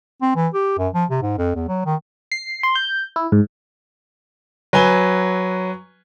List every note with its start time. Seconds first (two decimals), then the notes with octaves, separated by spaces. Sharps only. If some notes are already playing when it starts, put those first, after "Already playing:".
0.22 C4
0.36 E3
0.54 G4
0.78 F#2
0.94 F3
1.10 C3
1.22 G#2
1.38 F2
1.55 E2
1.68 F#3
1.86 D#3
2.32 C7
2.63 C6
2.75 G6
3.16 E4
3.32 G#2
4.73 F#3 B4 G#5 G7